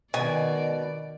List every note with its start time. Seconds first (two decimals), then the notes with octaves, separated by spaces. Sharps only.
0.14 B2 D#3 D5 G#5